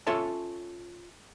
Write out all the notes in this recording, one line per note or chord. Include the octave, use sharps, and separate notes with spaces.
C#4 F4 A4 C#5 E5 A5